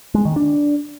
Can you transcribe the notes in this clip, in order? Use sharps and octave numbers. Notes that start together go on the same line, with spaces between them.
G#3
D#3
D4